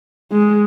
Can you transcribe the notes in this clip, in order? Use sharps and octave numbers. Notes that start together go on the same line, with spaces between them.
G#3